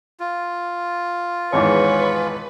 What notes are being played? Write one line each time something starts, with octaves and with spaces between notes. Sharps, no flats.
F4
G#1 E2 G#2 B4 C#5